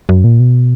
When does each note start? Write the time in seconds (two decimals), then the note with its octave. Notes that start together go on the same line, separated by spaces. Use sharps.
0.09 F#2
0.24 A#2
0.40 B2